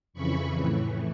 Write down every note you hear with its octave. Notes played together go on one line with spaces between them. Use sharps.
F2 C#3 E3 B5 C#6
A2 E3